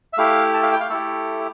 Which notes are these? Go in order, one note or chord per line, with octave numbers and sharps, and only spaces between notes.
E5
A3 E4 G4 F5
A5
F5
G5
F5
A3 E4 G4 A4